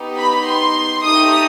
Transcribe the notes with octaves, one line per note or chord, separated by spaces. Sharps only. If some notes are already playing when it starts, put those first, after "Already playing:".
Already playing: B3 D#4 G4
B5
C6
A3 D#4 G4 D#6